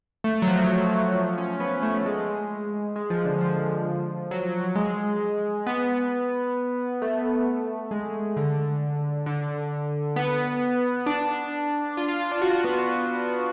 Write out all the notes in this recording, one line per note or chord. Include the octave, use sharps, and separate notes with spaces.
A3
F#3
F3
F3
C#4
B3
A3
G#3
G#3
F3
D3
F3
F#3
G#3
B3
A3
G#3
D3
D3
B3
D4
F4
F4
F4
D4
F#4
B3